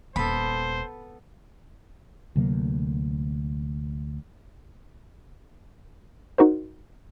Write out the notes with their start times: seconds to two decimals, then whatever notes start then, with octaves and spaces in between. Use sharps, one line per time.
0.16 D#1 B3 A4 C5 B5
2.36 D2 C3 F#3 A#3
6.38 D#4 F#4 A#4 C5